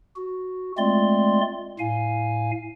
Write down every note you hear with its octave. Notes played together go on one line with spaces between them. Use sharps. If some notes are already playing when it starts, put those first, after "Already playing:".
F#4
G#3 A3 C4 F4 D5 C6
A2 F5 G#5